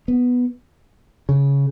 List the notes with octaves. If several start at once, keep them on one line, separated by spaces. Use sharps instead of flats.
B3
C#3